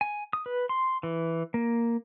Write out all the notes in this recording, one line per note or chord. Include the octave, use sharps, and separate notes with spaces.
G#5
D#6
B4
C6
E3
A#3